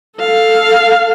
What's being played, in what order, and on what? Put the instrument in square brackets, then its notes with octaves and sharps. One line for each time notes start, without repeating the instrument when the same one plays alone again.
[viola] A4 F5